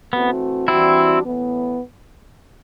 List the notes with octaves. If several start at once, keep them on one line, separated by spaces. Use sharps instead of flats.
E3 A3 B3 C4 F#4
E3 G3 C4 D4 E4 F#4
A2 E3 B3